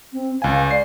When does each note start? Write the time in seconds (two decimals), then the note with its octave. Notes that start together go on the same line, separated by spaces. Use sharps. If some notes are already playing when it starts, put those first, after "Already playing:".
0.13 C4
0.42 C#2 F5 G#5
0.71 D5 C7